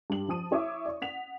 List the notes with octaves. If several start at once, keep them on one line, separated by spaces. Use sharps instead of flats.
G2 G4 F#7
F3 A5 D#6 D#7
E4 C#5 E5 D6 D#6
D5 C#6
F#5 B6 F7